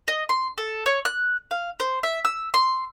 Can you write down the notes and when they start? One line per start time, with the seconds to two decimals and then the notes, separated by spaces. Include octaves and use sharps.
0.08 D#5
0.29 C6
0.58 A4
0.86 C#5
1.05 F#6
1.51 F5
1.80 C5
2.03 E5
2.25 E6
2.54 C6